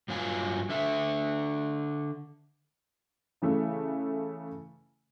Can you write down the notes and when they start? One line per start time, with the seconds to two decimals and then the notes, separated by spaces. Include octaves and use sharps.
0.08 G2 F#3 F4 G#5
0.69 D3 E5
3.42 C#3 E3 A3